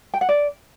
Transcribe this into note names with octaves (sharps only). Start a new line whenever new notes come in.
G5
F#5
D5